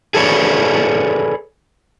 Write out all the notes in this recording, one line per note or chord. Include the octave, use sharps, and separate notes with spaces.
G#4 A4 B4 C#5 D5